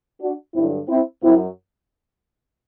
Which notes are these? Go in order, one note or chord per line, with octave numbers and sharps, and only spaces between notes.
D4 F#4
G2 D3 F#3 C4 E4
C4 E4
F#2 F#3 C4 E4